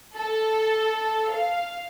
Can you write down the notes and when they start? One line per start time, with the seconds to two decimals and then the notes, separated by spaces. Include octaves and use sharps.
0.15 A4
1.32 F5